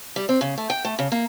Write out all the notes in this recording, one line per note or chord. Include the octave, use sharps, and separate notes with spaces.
G3
C4
C#3
A3
G5
A3
C#3
A#3